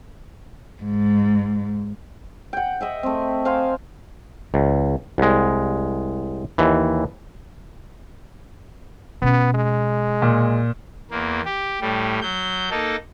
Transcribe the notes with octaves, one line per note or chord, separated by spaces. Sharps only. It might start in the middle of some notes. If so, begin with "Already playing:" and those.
G#2
F#5 G5
D#5 E5 G5
A3 C4
C5 F5 G5 G#5
C#2
C2 G#3
D#2 E3
B2 B3 C#4
G#3
A#2
E2 A#3
G4
A2 G3
F#3 G6
A#3 D#4 A4